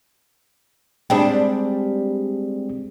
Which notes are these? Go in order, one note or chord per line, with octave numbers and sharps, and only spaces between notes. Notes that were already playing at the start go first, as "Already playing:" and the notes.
G3 G#3 C4 D4 G#4 G5